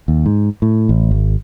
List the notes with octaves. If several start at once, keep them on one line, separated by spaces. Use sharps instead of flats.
D#2
G#2
A2
A1
G#1